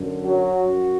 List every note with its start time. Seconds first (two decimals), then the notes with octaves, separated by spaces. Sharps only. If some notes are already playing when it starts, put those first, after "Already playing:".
Already playing: F#2 D3
0.24 F#3 F#4
0.66 F#2